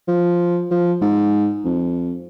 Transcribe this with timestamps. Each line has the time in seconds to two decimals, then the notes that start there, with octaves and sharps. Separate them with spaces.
0.07 F3
0.71 F3
1.01 G#2
1.64 F2